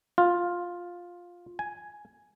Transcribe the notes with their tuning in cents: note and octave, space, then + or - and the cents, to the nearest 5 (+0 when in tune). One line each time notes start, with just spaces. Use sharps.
F4 +10
G#5 +5